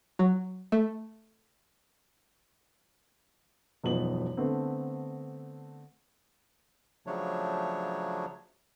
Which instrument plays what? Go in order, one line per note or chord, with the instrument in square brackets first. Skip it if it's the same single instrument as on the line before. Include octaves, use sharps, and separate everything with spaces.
[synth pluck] F#3
A3
[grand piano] E1 F#2 F3 B3 D#4 F#7
D3 A3 B3 C4
[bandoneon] C#3 F3 F#3 A3 D4 C#5